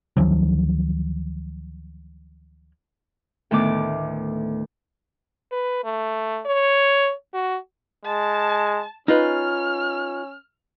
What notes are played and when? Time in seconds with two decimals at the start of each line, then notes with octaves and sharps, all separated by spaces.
0.17 D2 D#3 F3 F#3
3.51 D2 A2 D#3 B3 D6
5.52 B4
5.84 A3
6.46 C#5
7.34 F#4
8.05 G#3 A5
9.08 C#4 D#4 F4 B4 F6